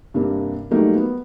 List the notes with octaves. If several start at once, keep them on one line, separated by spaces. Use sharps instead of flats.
G2 C3 A#3
F#3 G3 A3 A#3 D#4
B3